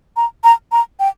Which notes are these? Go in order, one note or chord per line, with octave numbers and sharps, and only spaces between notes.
A#5
A#5
A#5
G5